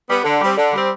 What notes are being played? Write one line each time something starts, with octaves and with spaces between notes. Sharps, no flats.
G3 B3
D3
G3 C4
D3
G3 C4